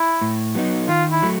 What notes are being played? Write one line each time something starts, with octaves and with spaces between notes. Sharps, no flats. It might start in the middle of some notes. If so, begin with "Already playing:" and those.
Already playing: E4
A2
F#3 B3 D#4
D#3 F4
E4
F#3 A3